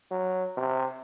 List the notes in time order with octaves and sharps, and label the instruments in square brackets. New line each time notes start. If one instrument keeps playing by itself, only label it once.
[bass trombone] F#3
C3